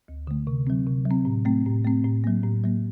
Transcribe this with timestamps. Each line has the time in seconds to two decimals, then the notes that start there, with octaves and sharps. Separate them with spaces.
0.08 D2
0.27 D3 A3
0.47 C3
0.67 F#3 C4
0.87 C3
1.06 F#3
1.11 C4
1.25 A2
1.45 A3 C4
1.66 A2
1.85 A3 C4
2.04 A2
2.24 F#3 A#3
2.44 A2
2.64 F#3 A#3